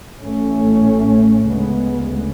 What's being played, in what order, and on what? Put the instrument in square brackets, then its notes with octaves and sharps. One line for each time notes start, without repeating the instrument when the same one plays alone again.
[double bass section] A1 A2 A3 C#4
D2 C#3 G#3 B3